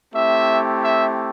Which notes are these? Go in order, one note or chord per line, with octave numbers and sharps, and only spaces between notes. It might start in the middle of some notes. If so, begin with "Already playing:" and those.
A3 C4 E4 G4 E5
E5